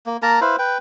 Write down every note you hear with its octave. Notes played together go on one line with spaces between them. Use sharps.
A#3
A#3 A#4 A5 A#5
E4 B4 C5 F5
B4 G5